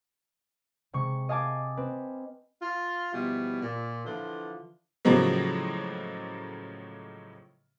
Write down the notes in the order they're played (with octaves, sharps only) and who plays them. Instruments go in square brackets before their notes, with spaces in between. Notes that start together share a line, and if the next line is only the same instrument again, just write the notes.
[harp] C3 G#3 C#6
D#5 F5 G#5 A5 D6
C4 B4
[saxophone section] F4
B2 E3 F3 G3
A#2
D3 E3 F3 F4
[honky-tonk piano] A2 C#3 F3 F#3 G#3 A#3